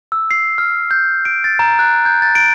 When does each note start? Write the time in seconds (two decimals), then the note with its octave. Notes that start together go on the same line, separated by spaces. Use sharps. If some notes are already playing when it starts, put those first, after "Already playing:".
0.12 E6
0.31 C7
0.58 F6
0.91 G6
1.25 D7
1.44 A6
1.59 A#5
1.79 F#6
2.05 G6
2.22 A6
2.35 D7